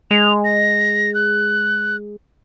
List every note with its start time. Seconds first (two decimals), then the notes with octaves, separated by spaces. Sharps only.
0.11 G#3 F7
0.45 A#6
1.14 F#6